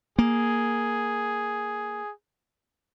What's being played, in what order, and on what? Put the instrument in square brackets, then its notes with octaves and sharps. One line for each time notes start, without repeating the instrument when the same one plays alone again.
[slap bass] A#3 [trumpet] G#4